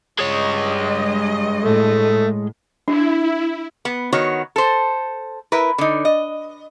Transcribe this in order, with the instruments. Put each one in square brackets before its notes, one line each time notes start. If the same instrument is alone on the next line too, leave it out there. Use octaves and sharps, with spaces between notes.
[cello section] G2 D#5 [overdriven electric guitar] G#3 C#5
[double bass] A2 [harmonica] A3
[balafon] D4 [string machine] E4
[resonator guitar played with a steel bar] B3
D#3 B3 F#4 C#5
A4 C5
E4 A#4 B4
D3 D#4
D#5